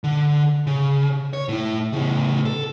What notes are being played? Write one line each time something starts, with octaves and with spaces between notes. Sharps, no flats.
D3
C#3
C#5
A2 E4
A2 C#3
A4